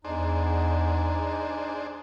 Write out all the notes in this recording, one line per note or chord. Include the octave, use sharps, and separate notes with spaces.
E2 D4 D#4 G#4 C5